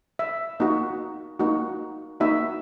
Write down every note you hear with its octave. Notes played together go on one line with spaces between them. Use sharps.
E5
A#3 D#4 F#4
A#3 D#4 F#4
A#3 D#4 F#4 E5